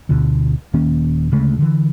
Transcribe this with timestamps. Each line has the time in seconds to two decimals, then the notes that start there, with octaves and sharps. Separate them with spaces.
0.09 D2 B2 D3
0.74 D#1 D#3 A#3 C#4
1.32 D2 C#3 G#3 A3
1.59 D3 E3